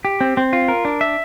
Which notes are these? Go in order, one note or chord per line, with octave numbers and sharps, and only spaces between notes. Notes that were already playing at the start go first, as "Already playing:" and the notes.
G4
C4
C4
F4
A#4
D4
E5